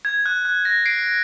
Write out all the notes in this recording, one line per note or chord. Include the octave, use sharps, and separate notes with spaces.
G#6
F#6
F#6
A#6
C7 D7